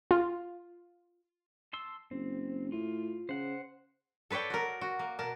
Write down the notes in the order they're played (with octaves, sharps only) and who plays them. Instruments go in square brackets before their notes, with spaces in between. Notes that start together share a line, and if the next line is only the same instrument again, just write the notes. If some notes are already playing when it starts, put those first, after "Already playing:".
[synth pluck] F4
[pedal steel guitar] A5 C6 E6
[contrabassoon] F#1 [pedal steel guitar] C4
[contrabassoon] A2 [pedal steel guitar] F4
[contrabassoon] C#3 [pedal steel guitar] C5 F#5
[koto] A4 B4 C#5 D5 G5
F#4 A#4
F#4
A#3
B2 A#4 A5